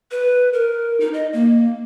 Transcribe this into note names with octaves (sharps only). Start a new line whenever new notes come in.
B4
A#4
D#4
D#5
A#3